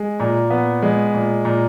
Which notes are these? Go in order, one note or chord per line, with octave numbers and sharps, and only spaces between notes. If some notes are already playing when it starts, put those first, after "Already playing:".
Already playing: G#3
A#2
B3
G#3
A#2
A#2